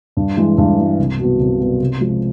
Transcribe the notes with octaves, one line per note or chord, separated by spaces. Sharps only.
G2
E3 G#3
G2
E3 G#3
C2
B2 F#3 B3
C2
B2 F#3 B3
C3
F3 G#3